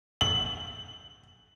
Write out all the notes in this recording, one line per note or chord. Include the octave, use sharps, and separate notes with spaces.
F#7